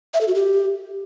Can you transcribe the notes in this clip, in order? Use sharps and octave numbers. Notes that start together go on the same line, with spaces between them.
E5
A4
F#4
G4